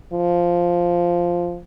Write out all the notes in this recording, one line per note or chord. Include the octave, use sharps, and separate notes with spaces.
F3